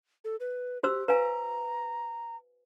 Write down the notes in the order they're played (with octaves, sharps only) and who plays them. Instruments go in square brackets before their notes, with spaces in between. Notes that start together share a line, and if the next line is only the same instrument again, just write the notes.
[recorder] A4
B4
[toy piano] F#4 C5 E6 [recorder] G4
[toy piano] B4 F5 G#5 [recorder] A#5